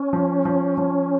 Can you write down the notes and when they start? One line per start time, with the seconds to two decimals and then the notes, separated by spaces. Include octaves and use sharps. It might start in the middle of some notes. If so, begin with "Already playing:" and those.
Already playing: C#4
0.13 F3
0.45 F3
0.77 F3